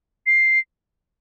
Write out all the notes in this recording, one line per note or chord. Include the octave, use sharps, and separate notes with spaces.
C7